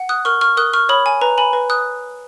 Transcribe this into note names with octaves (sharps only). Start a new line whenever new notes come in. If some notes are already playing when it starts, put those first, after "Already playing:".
Already playing: F#5
D#6 F#6
A#4 C#6 F6
C#6 F6
A#4 D#6 F#6
C#6 F6
C#5 B5 D#6
G#5
B4 A#5
G#5 B5
B4
D#6 F#6